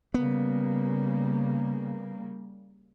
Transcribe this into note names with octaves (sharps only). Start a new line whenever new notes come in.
C#3 G3 A#3 B3